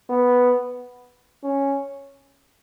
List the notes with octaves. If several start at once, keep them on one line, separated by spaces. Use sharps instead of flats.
B3
C#4